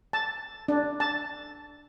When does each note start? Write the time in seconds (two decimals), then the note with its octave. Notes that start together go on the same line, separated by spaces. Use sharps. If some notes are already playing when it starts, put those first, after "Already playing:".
0.13 A5
0.68 D4
1.00 A5